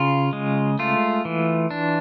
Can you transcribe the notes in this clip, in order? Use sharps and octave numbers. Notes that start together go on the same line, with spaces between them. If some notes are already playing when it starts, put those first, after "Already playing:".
Already playing: C#3 F4
G#3
A3 F4
E3
D4